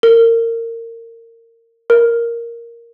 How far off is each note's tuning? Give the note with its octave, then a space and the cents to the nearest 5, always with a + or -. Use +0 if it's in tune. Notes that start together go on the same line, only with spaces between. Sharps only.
A#4 -25
A#4 +0